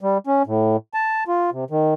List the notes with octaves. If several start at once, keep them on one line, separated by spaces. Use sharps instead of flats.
G3
C#4
A2
A5
F4
C3
D#3